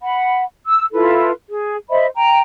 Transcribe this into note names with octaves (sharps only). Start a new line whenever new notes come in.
F#5 B5
E6
E4 F4 A4 B4
G#4
C5 D#5 E5 B5
G5 A#5